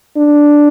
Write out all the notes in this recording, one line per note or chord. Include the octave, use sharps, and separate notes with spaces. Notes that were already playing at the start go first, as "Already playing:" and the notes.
D4